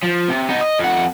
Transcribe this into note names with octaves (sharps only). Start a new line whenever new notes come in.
F3
C3
B3 D#4
D#5
F2 F#5